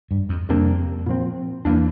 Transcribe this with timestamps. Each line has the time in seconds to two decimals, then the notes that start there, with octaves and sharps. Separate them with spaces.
0.11 G2
0.29 F2
0.49 F2 C3 G3 A#3 D4
1.06 A#2 F3 C4
1.65 E2 E3 A#3 D4